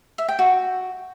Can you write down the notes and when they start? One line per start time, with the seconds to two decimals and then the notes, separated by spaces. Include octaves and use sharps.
0.18 E5
0.29 G5
0.39 F#4